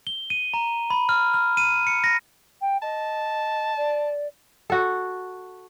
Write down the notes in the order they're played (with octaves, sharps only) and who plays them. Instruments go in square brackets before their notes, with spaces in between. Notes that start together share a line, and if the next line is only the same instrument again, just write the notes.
[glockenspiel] G7
D#7
A#5
B5
F6
F6
D#7
C#7
A#6
[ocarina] G5
[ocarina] D#5 [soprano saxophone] A5
[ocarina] D5
[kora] F#4 A4